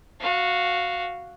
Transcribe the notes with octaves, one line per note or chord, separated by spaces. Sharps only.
F#4 F5